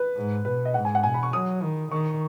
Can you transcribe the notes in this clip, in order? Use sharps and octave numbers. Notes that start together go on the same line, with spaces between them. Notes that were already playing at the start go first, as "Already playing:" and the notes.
Already playing: B4
G#2
B2 B4
D#5
G#2 F#5
G#5
F#5
B2 G#5
B5
C#6
F#3 D#6
D#3
D#3 C#6